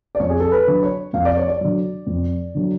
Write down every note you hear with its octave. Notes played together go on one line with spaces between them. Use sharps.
D5
F2 C#5
G#4
A4
B4
D3 F#3
C#5
F2 F5
D5
C#5
D5
D3 F#3
F2
D3 F#3